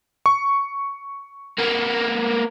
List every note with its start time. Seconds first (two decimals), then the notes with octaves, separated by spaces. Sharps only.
0.26 C#6
1.58 A#3 B3